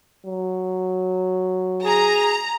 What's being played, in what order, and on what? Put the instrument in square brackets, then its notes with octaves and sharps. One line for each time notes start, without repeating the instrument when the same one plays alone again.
[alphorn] F#3
[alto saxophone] G#4 [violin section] A#5